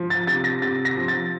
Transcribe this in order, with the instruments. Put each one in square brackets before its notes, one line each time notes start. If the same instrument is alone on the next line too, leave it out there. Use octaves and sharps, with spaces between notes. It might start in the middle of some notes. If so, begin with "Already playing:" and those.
Already playing: [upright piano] F3
A6
C3 A6
A#6
C3 A6
A#6
F3
A6